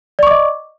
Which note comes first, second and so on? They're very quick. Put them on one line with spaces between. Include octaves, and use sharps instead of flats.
D5 C#6 D6 D#5